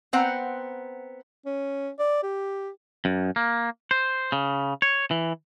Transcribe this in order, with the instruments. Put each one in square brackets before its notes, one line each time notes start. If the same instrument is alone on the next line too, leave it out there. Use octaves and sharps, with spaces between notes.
[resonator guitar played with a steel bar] B3 C4 C5 F#5 G5 A#5
[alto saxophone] C#4
D5
G4
[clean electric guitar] F#2
A#3
C5
C#3
C#5
E3